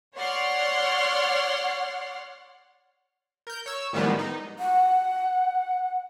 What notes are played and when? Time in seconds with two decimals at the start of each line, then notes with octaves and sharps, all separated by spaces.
0.15 C#5 D5 F#5 C6 F6
3.47 A#4 G6
3.66 C#5 E6
3.93 A2 D#3 F3 G3 G#3 B3
4.19 D#4
4.59 F#5